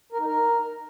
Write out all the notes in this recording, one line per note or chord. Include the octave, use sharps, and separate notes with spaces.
A#4
D#4
A#4